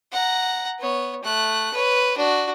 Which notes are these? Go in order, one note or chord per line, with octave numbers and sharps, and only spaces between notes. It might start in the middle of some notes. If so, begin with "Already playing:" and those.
F#5 A#5
B3 C#5
A3 F#6
B4 C#5
D4 F#4